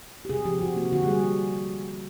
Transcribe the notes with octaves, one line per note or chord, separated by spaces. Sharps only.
G4
C3 G#4
F3 G4
C3 F#4
A#3 F#4
D3 F#4
G4
G3 G#4